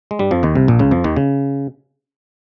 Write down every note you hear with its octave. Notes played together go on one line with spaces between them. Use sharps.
G#3
G2 G3
F2 F3
D#2 D#3
C2 C3
A#1 A#2
C#2 C#3
F2 F3
D#2 D#3
C#3